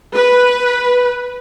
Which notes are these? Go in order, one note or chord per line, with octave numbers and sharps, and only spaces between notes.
B4